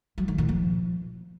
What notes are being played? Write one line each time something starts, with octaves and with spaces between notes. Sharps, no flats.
F#3
D#3
A#2
F3